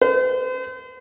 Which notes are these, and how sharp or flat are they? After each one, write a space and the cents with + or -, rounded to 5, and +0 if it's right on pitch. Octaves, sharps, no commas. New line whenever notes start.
C5 -45